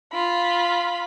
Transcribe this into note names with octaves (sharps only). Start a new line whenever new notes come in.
F4 B5